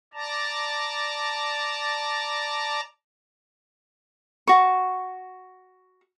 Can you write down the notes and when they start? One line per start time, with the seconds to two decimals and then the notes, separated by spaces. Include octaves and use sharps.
0.14 D5 A5 A#5
4.47 F#4 C#6